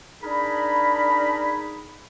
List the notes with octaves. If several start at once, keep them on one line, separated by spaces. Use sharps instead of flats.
D4 D#4 G#4 A#4 B5